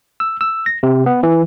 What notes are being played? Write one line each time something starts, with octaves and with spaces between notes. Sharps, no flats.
E6
E6
A#6
C3
B3
E3